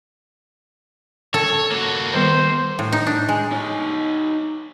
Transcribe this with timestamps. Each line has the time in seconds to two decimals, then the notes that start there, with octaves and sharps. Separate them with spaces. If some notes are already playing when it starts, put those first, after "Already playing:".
1.34 A4 C#5
1.71 A#3 F#4
2.14 D#3 G3 B3 C5
2.79 A2
2.92 D#4
3.07 D4
3.29 G#3
3.52 D#4 C#5